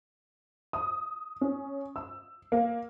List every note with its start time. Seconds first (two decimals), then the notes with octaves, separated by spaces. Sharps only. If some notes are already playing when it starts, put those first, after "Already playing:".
0.73 D#6
1.41 C#4
1.96 E6
2.52 A#3